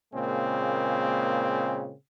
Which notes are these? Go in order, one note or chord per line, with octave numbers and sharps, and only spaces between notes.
A#2 C#3 G#3 A#3 C4